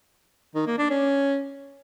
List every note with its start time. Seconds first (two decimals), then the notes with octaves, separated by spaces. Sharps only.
0.55 D#3
0.67 A#3
0.78 D4
0.90 C#4